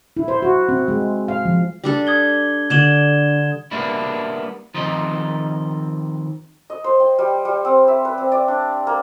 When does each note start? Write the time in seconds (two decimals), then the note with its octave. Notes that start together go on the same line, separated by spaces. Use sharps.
0.17 E4
0.28 C5
0.42 F#4
0.69 C4
0.88 G#3
1.28 F5
1.45 F3
1.84 G3 D4 A4
2.07 D#6 G#6 G7
2.70 D3 D5 G#6 E7 G7
3.71 G3 A#3 B3 D4 E4
4.74 D#3 F3 C4 D#5
6.70 D#5
6.84 C5
7.00 G5
7.19 G3
7.45 G3
7.65 C4
7.88 E5
8.05 B4
8.18 C4
8.32 D5
8.48 D4
8.87 A#3